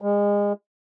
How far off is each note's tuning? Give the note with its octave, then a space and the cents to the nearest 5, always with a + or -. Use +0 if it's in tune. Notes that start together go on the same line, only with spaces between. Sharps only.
G#3 -30